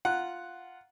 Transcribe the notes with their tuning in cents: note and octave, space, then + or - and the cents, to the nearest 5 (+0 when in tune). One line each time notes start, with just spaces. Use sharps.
F4 +0 F#5 +0 A#5 +10